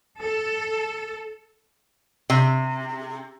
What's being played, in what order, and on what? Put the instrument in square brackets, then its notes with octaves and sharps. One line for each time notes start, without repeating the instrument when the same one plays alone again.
[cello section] A4
[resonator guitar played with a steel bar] C3